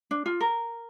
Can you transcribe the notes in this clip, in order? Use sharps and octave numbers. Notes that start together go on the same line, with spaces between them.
D4
F4
A#4